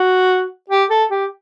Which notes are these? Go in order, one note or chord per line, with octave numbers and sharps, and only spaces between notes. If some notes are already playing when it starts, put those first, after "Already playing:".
Already playing: F#4
G4
A4
G4